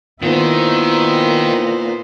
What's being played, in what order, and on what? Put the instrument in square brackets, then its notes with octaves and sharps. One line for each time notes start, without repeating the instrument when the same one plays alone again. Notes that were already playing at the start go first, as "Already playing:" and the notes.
[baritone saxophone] A#2 [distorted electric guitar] D#3 D#4 [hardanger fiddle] B3 C5 [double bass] E4